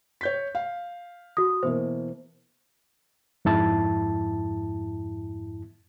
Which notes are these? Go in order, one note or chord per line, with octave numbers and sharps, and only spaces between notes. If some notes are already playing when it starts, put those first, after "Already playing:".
C#5 G6 B6
F5
F#4 D#6
B2 E3 A#3 C5
F2 G#2 E4 A5